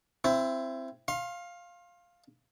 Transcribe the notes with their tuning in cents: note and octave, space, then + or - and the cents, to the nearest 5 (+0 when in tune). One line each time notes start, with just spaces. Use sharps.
C4 +0 E4 +25
F5 +0 C6 +35